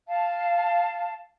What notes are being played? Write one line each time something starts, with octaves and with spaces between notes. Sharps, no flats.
F5 A5